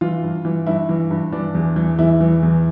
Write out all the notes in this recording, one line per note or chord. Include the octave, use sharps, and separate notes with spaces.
E3 F4
G2
E3
G2 E4
E3
G2
E3 D4
E2
E3
E2 E4
E3
E2